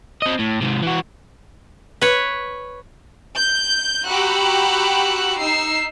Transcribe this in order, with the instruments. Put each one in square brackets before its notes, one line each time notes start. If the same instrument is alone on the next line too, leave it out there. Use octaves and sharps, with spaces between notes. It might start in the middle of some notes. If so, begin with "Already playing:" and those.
[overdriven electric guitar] C4 D#5
A2
G#2 C3
E3 F#4
[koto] B4 C#5
[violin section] G6
F#4 G4 A#5 B5 E6 F#6
D#4 E6 C7